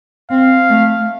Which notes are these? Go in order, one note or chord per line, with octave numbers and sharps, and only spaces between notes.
C4 F5
A3